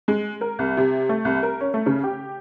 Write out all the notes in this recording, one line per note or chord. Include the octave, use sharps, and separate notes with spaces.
G#3
A#4
C2
C3
A3
C2
A#4
C#4
A3
C#3
G4